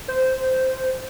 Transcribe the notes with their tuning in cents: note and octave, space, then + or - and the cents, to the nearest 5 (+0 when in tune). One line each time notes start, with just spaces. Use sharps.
C5 -10